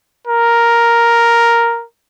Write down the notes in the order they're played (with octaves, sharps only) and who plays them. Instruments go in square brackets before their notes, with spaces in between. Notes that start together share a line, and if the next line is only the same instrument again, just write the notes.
[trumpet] A#4